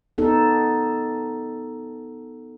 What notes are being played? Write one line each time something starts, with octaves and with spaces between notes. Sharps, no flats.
B3 D#4 A4